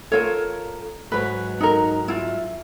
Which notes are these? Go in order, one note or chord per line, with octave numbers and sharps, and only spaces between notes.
F4 A4 A#4 C#5
G#2 F#3 B4
D#4 A#4
E4 F4